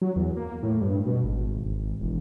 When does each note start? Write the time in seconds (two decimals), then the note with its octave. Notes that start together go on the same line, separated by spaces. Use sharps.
0.02 F#3
0.16 E2
0.37 A#3
0.63 A2
0.81 G2
1.06 B2
1.24 G#1
1.65 G#1
2.01 E1